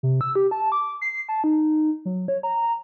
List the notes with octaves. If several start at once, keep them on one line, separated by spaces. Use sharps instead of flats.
C3
E6
G4
A5
D6
C7
A5
D#4
F#3
C#5
A#5